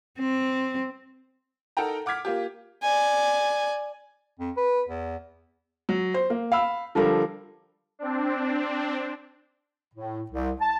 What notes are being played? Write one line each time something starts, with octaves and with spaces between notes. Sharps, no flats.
C4
D#4 A4 A#4 F#5 G5 A#5
F#5 D6 F6 G#6 B6
A#3 F4 G4
D5 G#5
F2
B4
E2
F#3
C5
A#3
F5 B5 E6
D3 F3 G3 A4 A#4
C4 D4
A2
C2
A5